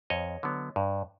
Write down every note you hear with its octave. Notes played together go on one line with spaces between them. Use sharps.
F2 C#5 D#5
D3 F#3 B3
G2